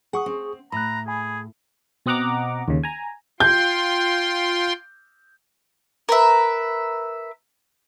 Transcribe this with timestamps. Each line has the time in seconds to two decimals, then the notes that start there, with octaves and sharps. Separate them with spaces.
0.13 G#4 F#5 C#6 D#6
0.26 C4
0.72 A2 A#5 B5 F#6
1.08 G#4 G#5 B5
2.06 B2 C4 D#5 F#5 A#5 D6
2.68 D#2 C#3
2.84 G#5 A#5
3.40 F4 G5 C6 G6
6.09 A#4 B4 E5